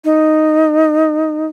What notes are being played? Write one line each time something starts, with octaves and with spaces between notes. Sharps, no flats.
D#4